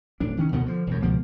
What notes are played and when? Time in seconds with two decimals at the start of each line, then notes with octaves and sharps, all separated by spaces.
0.20 D1 D4
0.37 D#3 C#4
0.52 D2 B2 D#3 B3
0.66 D3 F3
0.87 E1 F#2
1.02 C#2 B2 F3 A#3